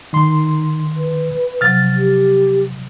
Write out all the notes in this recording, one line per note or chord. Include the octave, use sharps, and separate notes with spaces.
D#3 D#4 C6
B4
C3 F3 F#3 F6 A6
G4